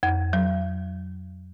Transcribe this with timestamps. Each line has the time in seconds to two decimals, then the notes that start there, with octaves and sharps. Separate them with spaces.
0.03 F2
0.33 F#3